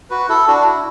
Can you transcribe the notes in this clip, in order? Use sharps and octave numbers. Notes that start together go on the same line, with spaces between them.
F#4 B4
E4 A4
D4 F#4
E4